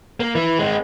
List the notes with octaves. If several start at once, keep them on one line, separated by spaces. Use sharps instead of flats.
A#3
E3
G#3 C4